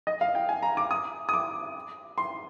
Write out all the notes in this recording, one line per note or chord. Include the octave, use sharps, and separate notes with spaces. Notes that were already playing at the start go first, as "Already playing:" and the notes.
D#5
F5
G5
G#5
A#5
D6
D#6
D#6
D6
C6